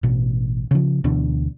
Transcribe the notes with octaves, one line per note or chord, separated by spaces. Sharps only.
A1 B2
C#3 F3
D2 B2 E3 D4